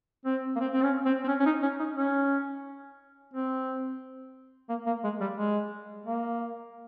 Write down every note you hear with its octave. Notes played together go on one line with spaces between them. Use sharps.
C4
A#3
C4
C4
C#4
C4
C4
C#4
C#4
D#4
C#4
D#4
C#4
C4
A#3
A#3
G#3
G3
G#3
A#3